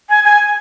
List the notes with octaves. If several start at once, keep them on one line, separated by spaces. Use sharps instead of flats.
G#5
G#5